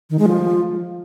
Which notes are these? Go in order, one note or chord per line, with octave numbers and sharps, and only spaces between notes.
D#3
G#3
F3